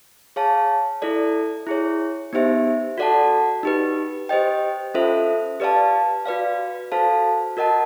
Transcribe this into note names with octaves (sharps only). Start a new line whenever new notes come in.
G#4 C#5 F5 A5
E4 A4 D5
E4 G#4 C#5
B3 D#4 G4 C5 E5
F#4 A4 D5 F#5 A5
D#4 G4 B4
G4 C5 D#5 G5
C#4 F4 A4 C5 E5
G4 B4 D5 F5 A5
F#4 B4 D5 F5
F#4 A4 C5 F5 A5
F#4 A#4 D#5 F#5 A5